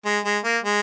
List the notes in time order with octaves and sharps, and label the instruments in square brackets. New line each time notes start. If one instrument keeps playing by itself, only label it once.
[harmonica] G#3
G#3
A#3
G#3